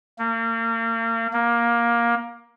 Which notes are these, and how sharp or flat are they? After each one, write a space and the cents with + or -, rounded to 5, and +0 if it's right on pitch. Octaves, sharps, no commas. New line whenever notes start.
A#3 -35
A#3 +15